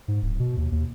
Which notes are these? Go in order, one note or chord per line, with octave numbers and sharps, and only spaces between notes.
G#2
D1
B2
D#2
D#2